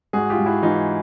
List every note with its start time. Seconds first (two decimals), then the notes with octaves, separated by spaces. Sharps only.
0.13 G#2 F#4 G#4
0.30 F4 G4
0.38 G#2
0.46 E4 F#4
0.62 E3 D#4 F4